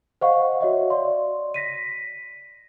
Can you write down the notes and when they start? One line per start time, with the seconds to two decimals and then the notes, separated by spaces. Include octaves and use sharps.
0.21 C5 D#5 F5 F#5 C#6
0.60 F#4 C#5 D#5 E5
0.90 D5 C6
1.54 A#6 B6 D#7